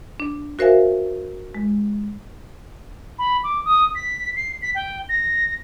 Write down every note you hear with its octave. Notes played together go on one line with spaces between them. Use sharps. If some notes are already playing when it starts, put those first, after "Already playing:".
D4
F#4 A#4 C5 E5 F5 G#5
G#3
B5
D6
D#6
B6
C7
B6
G5
A#6